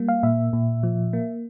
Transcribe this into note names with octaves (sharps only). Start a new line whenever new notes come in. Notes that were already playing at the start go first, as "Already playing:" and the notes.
Already playing: G3 A#3
F5
A#2 E5
A#2
F3
A#3